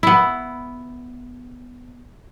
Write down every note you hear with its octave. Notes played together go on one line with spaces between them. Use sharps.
B3 E4